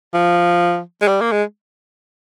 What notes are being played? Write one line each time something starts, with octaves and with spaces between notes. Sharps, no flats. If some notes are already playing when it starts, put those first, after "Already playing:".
F3
G#3
G3
A#3
G#3